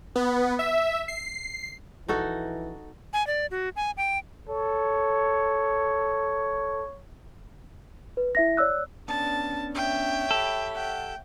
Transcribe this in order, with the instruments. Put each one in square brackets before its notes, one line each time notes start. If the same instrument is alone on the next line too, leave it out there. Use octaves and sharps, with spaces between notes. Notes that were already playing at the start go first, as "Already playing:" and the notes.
[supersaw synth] B3
E5
C7
[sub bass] A#1 [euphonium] E3 [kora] D#4 F#4 A4
[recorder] G#5
D5
F#4
G#5
G5
[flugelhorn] A4 [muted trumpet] C#5
[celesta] B4
E4 E5 A#6
C#5 D5 E6 F#6
[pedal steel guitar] B3 C#4 D4 [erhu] A5
[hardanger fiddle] C#5 E5 [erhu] G5
[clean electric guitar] G4 A4 [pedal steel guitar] B5
[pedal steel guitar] F#5 [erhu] G5